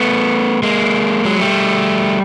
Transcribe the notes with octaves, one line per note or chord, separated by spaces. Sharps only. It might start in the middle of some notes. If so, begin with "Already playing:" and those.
Already playing: A3 B3
G#3 A#3
F#3 G#3
G3 A3